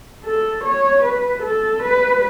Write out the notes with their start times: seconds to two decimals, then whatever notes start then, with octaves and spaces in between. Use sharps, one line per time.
0.24 A4
0.63 C#5
1.03 B4
1.42 A4
1.82 B4